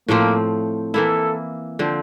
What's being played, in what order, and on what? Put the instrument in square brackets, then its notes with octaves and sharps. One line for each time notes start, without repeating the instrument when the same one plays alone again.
[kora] A2 F3 A3 C4 [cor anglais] A#3
[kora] E3 A#3 E4 [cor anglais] A4
[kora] D3 F3 C4